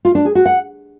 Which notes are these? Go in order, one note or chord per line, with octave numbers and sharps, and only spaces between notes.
F4
D4
G#4
F#4
F#5